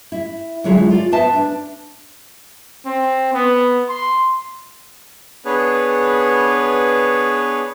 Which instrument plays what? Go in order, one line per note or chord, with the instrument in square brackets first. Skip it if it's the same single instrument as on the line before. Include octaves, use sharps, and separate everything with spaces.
[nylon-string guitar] E4
D3 F#3 G#3 E4 F4 C#5
F4 D5
B3 B4 C5 E5 A5
D4
[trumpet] C4
B3
C6
[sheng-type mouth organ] B3 D4 G#4 B4 C#5